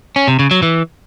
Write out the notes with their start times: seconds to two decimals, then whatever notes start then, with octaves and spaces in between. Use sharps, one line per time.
0.16 C#4
0.28 C3
0.39 C#3
0.51 F#3
0.63 E3